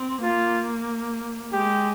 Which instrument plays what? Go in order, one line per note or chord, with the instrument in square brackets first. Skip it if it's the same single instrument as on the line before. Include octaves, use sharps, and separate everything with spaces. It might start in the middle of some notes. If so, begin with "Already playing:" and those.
Already playing: [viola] C4
[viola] A#3 [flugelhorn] F4
[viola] G#3 [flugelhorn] G4